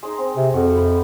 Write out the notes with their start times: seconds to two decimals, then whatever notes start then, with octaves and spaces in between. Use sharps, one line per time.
0.03 G#3 D#4
0.18 C4
0.36 C3
0.54 F2 F#4
0.76 B5